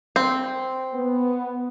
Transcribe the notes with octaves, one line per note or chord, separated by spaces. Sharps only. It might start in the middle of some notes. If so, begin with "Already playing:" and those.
C4
B3